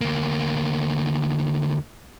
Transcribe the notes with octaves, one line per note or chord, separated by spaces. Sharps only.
D2 A#3